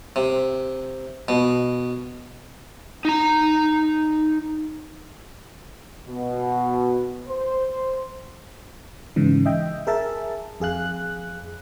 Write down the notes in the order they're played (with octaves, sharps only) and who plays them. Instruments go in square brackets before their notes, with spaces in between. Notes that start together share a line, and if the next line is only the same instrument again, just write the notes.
[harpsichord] C3
B2
[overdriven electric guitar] D#4 A#5
[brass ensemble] B2
C5
[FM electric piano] G#2 C#3 E3
D#5 E5 G5
G#4 A#4 E5 A5
F2 G#4 F5 F#6